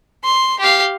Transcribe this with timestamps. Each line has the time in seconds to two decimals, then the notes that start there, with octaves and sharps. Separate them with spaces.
0.24 C6
0.59 G4 F5